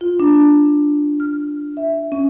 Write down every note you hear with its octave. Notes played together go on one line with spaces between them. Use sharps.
F4
D4
F6
E5
C#4